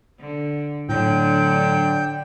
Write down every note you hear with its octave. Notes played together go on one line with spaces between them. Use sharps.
D3
A2 D3 F#3 D4 G5